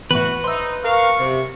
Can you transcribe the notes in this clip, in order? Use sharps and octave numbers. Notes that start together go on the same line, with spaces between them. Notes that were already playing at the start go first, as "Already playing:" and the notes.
E2 A2 F#4 B4
D#4 C5 E5
A#4 F5 C#6
C3